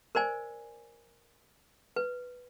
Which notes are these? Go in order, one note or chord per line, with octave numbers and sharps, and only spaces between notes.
A#4 C5 D5 G#5
B4